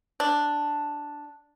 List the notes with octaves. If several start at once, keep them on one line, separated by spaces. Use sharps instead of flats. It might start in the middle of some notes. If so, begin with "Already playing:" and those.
D4